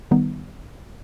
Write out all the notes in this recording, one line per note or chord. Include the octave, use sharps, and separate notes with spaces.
D#3 G3 B3 D#4